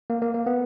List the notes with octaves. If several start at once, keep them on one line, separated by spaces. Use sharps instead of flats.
A#3
A#3
A#3
B3